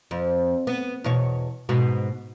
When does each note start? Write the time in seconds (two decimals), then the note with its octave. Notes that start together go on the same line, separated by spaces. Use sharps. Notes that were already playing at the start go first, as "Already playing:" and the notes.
0.11 F2
0.67 B3
1.04 E2 B2 C#5
1.69 G#2 B2 F#4